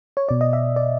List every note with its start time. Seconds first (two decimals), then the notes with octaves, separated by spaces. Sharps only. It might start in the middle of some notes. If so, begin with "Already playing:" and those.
0.17 C#5
0.29 B2 D5
0.41 D#5
0.53 E5
0.76 D5